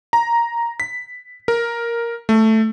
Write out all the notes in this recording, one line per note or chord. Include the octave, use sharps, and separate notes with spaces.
A#5
B6
A#4
A3